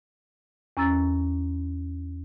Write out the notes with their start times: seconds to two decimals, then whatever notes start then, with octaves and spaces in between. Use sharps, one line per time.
0.77 E2 C#4 A#5 E6 A6